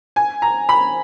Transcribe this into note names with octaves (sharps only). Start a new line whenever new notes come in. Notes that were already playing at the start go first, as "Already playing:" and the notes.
G#5
A#5
B5